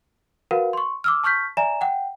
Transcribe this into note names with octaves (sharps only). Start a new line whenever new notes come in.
F#4 A#4 B4 F5 F#5
C6 C#6
D6 E6 F6
A5 C#6 F6 G6 B6
D5 E5 G#5 A#5 E7
F#5 G5